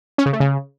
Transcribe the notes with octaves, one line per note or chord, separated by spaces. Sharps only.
C#4
C#3
A3
C#3